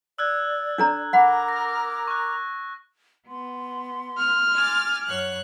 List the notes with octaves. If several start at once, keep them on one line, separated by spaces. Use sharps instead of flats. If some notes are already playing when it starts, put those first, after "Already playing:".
D5 E6 F#6 G#6
D4 A4 A#5
A#4 F#5 A#5 B5 D6
A#6
C#6 F#6
B3 C6
F6
G#5 D6 A6
F#2 C#5 F#6